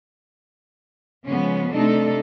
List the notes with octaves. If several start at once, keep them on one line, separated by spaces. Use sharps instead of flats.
C#3 F3 G#3 B3 C#4
C3 A3 D4 D#4 A4